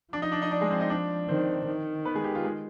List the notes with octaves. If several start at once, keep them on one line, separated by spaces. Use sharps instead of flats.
F3 D4 D5
D#4 D#5
D4 D5
D#4 D#5
D4 D5
G#3 G#4
C4 C5
D#4 D#5
D4 D5
D#3 C4 C5
D#3
B3 B4
G#3 G#4
G4
F4
G#3 G#4